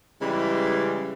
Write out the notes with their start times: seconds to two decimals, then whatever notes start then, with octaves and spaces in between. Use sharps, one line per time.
0.21 C#3 E3 G3 G#3